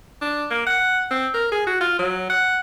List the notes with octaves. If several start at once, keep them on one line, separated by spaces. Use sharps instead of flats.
D4
A#3
F#5
C4
A#4
G#4
F#4
F4
F#3
F#5